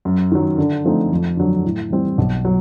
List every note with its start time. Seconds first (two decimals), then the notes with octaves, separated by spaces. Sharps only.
0.05 F#2
0.32 D#3 F#3
0.58 D3
0.85 F3 A3 C4 D#4
1.12 F2
1.37 D3 F#3
1.65 A2
1.90 E3 G3 C4
2.18 B1
2.45 F#3